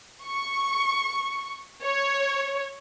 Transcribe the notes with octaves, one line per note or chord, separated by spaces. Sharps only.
C#6
C#5